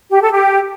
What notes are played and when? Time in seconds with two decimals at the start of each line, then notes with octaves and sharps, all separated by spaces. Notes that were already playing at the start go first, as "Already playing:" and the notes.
0.10 G4
0.21 A4
0.32 G4